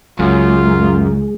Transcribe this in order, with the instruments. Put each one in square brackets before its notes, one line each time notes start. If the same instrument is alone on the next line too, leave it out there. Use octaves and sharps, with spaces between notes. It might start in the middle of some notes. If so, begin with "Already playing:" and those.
[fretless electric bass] C#2 [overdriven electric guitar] F#2 [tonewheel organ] G#3 [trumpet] F4